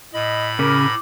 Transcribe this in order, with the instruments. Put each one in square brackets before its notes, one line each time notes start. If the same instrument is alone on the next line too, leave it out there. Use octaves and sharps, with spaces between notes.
[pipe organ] A2 B5 [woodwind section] D#5
[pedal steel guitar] C#3 [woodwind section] A#4 [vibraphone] D6